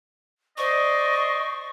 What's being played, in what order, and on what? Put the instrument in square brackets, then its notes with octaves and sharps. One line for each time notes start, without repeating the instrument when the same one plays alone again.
[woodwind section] C5 D5 D#5 [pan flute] C#6